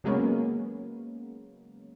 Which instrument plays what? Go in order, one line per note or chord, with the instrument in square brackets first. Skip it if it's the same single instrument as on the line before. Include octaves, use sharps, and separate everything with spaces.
[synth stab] C#3 F#3 G#3 A#3 B3 C#4